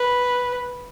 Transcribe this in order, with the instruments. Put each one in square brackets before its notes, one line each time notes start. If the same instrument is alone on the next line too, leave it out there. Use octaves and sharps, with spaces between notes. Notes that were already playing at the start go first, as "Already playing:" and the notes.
Already playing: [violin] B4